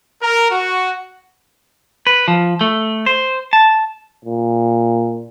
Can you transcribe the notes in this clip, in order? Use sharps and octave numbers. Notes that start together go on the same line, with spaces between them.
A#4
F#4
B4
F3
A3
C5
A5
A#2